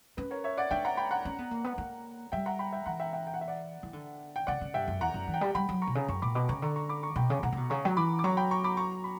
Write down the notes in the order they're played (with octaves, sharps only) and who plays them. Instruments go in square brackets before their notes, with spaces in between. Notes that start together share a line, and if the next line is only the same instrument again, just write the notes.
[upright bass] C#4 [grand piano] B4
[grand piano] A#4 C#5
C#5 E5
D5 F#5
[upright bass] D4 [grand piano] E5 G5
[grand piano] F#5 A#5
G5 B5
F#5 A#5
[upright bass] C#4
B3
A#3
B3
A#3
[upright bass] G3 [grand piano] E5 G5
[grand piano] F#5 A#5
G5 B5
E5 G5
[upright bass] E3 [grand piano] F#5 A#5
[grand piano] E5 G5
E5 G5
G5
F#5
E5
D5 F#5
[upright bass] E3
D3
[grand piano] G5
[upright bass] C#3 [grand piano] D5 F#5
[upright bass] C#3
[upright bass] G2 [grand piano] E5 G5
[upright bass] F#2
[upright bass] E2 [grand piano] F#5 A#5
[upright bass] F#2
E3
[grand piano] G5
[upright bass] G3 [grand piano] A#5
[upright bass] G3 [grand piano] G5 B5
[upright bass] F#3
[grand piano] A#5 C#6
[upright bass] B2
C#3
[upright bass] F#2 [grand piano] A#5 C#6
[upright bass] A#2 [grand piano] B5 D6
[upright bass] B2 [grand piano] B5 D6
[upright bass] C#3 [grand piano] A#5 C#6
[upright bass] D3 [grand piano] A#5 C#6
[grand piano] A#5 C#6
B5 D6
A#5 C#6
[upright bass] B2 [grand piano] G5 B5
[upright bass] C#3
[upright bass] B2 [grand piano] F#5 A#5
[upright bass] C#3
B2
[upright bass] C#3 [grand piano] A#5 C#6
[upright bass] F#3
[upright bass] E3 [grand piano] B5 D6
[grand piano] D6
[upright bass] F#3 [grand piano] A#5 C#6
[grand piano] G5 B5
A#5 C#6
B5 D6
A#5 C#6
B5